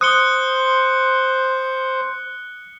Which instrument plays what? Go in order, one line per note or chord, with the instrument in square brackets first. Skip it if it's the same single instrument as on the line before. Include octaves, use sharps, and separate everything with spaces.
[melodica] C5 [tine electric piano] D#6 [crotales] F#6 C#7 G7